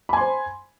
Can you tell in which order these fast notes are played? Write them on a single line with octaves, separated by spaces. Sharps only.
B5 G#5 C6 C5